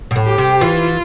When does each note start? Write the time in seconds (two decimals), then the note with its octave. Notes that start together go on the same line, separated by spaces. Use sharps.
0.11 B2
0.16 A2
0.27 G4
0.38 C3
0.61 E3 F4